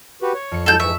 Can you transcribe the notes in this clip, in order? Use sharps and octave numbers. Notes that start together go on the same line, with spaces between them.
F#4 G4 B4
C#5
F2 C#7
A2 F#3 G#3 A4 G6
G#2 E3 E5 C#6